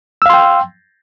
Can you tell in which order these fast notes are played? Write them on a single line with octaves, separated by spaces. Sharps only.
E6 F5 C6 G5